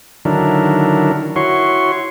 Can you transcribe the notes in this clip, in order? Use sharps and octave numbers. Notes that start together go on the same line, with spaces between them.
D3 D#3 F#3 D4 E4 A#4
E4 F#4 C#5 C6 C#6